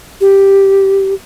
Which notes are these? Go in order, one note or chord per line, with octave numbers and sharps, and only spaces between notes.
G4